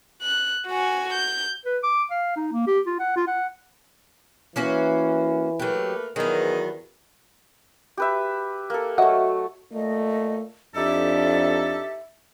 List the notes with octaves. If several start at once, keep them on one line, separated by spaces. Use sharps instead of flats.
F#6
F#4 G#5
G6
B4
D6
F5
D#4
A#3
G4
F4
F#5
F4
F#5
E3 A#3 C#4 F#4
F#3 A3 A#3 G4 B4
E2 D#3 F#3 B3 G#4
G4 B4 E5
A#3 A4
F#3 A3 D#5 E5 F#5
A#2 A3 D#5
F2 D4 D#4 G4 A4 E5